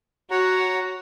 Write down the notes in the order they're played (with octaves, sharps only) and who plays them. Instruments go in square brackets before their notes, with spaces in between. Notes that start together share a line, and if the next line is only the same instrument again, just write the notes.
[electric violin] F#4 [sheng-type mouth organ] C#5 F#5 A#5